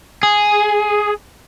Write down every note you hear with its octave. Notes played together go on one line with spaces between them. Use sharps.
G#4